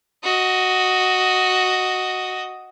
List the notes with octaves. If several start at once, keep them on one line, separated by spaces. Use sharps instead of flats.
F#4 D#5